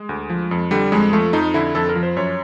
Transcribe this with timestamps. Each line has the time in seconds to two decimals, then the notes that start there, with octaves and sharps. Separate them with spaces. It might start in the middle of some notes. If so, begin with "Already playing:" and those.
Already playing: G#3
0.09 D2
0.30 F3
0.51 F2
0.71 D3 G3
0.92 F2 G#3
1.13 F3 A3
1.33 F2 D#4
1.54 D3 E4
1.75 F2 A4
1.89 A#4
1.96 F3
2.03 C5
2.16 F#2 C#5